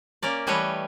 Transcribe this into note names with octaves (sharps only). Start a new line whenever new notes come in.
A#3 C#4 A#4 D5
E3 G3 A3 B4 C#5 D#5